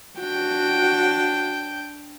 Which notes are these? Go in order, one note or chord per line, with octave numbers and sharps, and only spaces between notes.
D4 F#4 G5